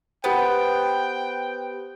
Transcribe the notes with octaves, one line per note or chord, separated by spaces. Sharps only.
B3 G4 B4 C5 G5